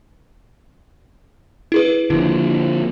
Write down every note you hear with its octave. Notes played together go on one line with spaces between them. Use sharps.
E4 G#4 B4
D3 F3 A#3 E4